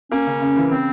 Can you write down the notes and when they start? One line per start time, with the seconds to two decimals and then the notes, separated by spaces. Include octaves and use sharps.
0.11 A#3 C#4
0.26 C#3
0.42 C#3
0.56 E3
0.71 C#3 C4